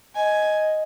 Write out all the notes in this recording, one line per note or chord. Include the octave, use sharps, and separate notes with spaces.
D#5 G#5